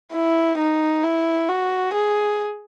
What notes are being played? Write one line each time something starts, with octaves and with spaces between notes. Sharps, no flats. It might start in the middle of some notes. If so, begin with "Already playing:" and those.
E4
D#4
E4
F#4
G#4